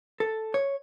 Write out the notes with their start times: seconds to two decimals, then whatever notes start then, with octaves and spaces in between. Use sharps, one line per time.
0.20 A4
0.54 C#5